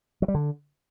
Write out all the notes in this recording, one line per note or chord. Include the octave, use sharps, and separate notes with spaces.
F#3
G3
D3